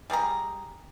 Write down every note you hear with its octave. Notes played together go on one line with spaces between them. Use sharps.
G3 G#4 C5 A#5